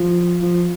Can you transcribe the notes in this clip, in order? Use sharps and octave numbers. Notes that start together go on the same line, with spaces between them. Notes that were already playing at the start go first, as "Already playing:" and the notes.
Already playing: F3
F3